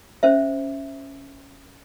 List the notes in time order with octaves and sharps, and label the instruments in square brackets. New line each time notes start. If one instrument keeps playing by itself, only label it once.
[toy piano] C#4 C5 E5